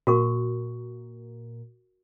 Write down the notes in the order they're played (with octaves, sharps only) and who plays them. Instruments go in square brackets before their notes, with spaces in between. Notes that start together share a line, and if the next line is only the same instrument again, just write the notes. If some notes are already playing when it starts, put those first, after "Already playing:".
[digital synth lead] A#2 [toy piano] F#4 A#4 C#6